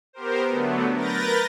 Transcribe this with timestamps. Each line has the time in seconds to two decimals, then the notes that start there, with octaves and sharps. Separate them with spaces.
0.13 B3 G4 A#4 C5
0.48 D3 F#3 A3 B3
0.94 A#4 B4 G6 A6 A#6